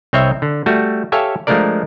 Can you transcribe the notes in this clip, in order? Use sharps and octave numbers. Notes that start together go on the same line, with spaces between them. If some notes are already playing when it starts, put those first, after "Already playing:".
C2 C4 C#5 D#5 E5
D3
G3 A3 F#4
G4 A4 C#5 E5 F5 G#5
F3 G#3 A3 D4 A#4 D5